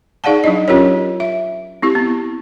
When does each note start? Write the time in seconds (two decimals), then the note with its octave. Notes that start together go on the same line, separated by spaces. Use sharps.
0.24 D#4 G#4 D5 F5 F#5 A5
0.44 F#3 D4 E4 D#5
0.68 C#4 F4 G4 A#4 C#5
1.20 E5
1.82 C4 E4 G4
1.95 B3